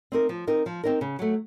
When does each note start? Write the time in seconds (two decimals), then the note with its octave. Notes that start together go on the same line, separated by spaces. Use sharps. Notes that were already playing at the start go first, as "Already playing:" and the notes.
0.12 C4 D#4 A#4
0.29 F3
0.48 C4 D#4 A#4
0.66 F3
0.84 C4 D#4 A#4
1.01 C#3
1.19 F#3 A3